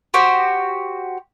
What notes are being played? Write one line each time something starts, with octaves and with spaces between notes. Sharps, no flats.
F#4 G4 C5